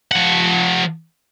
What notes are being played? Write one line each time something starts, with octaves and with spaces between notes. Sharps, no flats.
F3 F#5